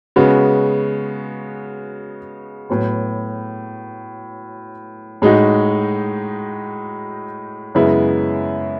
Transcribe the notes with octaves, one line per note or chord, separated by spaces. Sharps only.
C#3 G#3 B3 F#4
A2 F#3 B3
A2 G#3 D#4 F#4
F#2 C#3 G#3 B3 E4